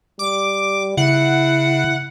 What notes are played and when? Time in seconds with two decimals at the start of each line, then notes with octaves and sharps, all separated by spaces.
0.19 G3 D6
0.97 C#3 E4 F#5